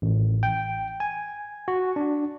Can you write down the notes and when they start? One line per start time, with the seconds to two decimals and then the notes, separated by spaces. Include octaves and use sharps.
0.02 A1
0.43 G5
1.00 G#5
1.68 F#4
1.96 D4